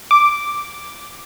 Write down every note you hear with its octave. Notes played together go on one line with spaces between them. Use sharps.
D6